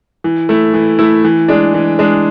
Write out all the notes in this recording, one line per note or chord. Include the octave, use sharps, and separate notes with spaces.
E3
A3 E4
E3
A3 E4
E3
G#3 D4
E3
G#3 D4